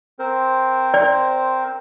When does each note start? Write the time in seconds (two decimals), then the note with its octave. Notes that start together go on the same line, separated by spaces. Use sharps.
0.19 C4 A#4 C5
0.94 D5